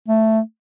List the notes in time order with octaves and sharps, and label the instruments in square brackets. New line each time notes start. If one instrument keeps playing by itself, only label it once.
[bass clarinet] A3